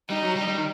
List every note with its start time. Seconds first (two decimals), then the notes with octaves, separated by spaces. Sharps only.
0.10 G3 D#4
0.23 F#3
0.36 G3
0.48 G3
0.58 D#3